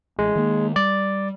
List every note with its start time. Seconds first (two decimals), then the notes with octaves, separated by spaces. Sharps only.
0.19 A1 G#3
0.36 D#3 A#3
0.76 G3 D5